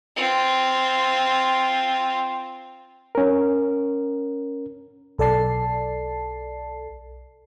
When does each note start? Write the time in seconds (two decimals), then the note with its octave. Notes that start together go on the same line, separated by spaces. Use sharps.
0.16 C4 F4
3.15 C#4 A#4
5.18 B1 A4 D5 A5 C7